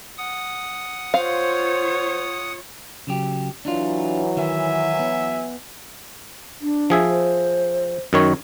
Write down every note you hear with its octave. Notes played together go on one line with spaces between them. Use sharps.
F#5 D#6
F4 C5 C#5 F5
C#3 F#3 G4
E3 F#3 D4 D#4 F4
D#3 E5 G#5
B3
D4
F3 G#4 E5
C5
F#2 D#3 C#5